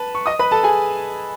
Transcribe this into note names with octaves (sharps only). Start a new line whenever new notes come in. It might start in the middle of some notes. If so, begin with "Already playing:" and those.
Already playing: B4 A5
C#6
D#5 D#6
B4 B5
A4 A5
G#4 G#5